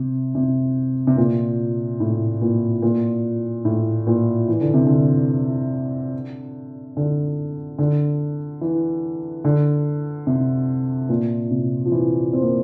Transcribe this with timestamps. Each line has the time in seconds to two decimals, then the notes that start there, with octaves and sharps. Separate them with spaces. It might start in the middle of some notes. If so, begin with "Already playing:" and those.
Already playing: C3
0.35 C3
1.07 C3
1.17 A#2
2.00 A2
2.42 A#2
2.82 A#2
3.65 A2
4.07 A#2
4.48 E3
4.61 D3
4.74 C3
4.87 D3
6.97 D3
7.78 D3
8.61 E3
9.44 D3
10.27 C3
11.09 A#2
11.51 C3
11.86 F3
11.92 E3
12.33 C4
12.42 A#3